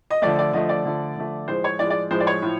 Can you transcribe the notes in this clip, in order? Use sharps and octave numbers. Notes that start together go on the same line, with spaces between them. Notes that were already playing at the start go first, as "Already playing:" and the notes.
D#5
D3 F3 A3 D5
D5
D3 F3 A3 D#5
D5
D3 F3 A3
D3 F3 A3
A2 F3 G#3 C5
C#5
A2 F3 G#3 D5
D5
A2 F3 G#3 C5
D5
C#5
A2 F3